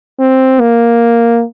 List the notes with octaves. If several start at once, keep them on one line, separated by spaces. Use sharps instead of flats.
C4
A#3